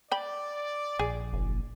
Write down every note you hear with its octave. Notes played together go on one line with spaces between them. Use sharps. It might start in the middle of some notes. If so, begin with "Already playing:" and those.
D5 G5 B5
A#1 G#4
F#1